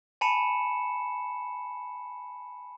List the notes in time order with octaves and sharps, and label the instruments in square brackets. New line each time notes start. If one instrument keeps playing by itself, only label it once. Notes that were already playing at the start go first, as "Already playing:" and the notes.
[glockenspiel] G#5 A5 B5 C#7 E7